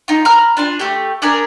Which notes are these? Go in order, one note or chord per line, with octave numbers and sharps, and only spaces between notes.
D#4 F4
A#5 B5 F6
D4 F4 G#5
A3 G4
D4 G#4 A#4 B5